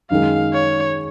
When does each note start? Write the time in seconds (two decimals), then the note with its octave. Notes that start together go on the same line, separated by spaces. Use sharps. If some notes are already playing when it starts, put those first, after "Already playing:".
0.10 F#2 D#3 G#3 F5
0.54 C#5